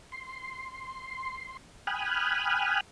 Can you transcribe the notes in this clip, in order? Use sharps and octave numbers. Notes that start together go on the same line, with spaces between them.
C6
G5 G#5 B5 D#6 F6 F#6